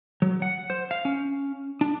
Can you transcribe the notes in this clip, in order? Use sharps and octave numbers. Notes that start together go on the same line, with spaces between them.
F#3
F#5
C5
F5
C#4
D4